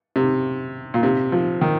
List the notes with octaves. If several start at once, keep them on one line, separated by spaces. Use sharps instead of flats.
C3
A#2
C3
F3
D#3